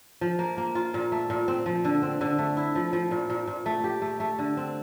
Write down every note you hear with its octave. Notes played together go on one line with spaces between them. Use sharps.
F3
A#3
A#3
F4
A#2
A3
A#2
C4
F3
D3
C4
D3
A3
E4
F3
F3
A#2
A#2
A#2
A3
G4
A3
A3
D3
C4